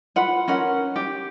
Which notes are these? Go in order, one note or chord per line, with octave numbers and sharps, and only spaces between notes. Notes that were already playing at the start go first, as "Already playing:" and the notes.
F4 B4 F#5
C#4 A#4 F#5
G4